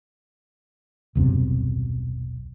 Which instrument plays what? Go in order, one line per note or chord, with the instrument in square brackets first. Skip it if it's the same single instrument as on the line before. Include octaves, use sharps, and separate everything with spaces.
[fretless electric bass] D#1 B1 F#2 C3